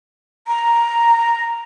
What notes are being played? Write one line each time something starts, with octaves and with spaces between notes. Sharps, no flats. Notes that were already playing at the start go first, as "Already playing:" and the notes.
A#5